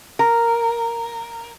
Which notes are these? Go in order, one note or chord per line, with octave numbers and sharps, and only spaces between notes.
A#4